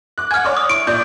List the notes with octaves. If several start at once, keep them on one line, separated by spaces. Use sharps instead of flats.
D6 F#6
F#5 G#5 F6 G#6
C#5 D5 D6
D#6
E4 C#6 D7
A#2 D5 G6